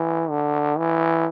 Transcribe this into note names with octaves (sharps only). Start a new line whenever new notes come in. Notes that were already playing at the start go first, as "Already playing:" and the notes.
Already playing: E3
D3
E3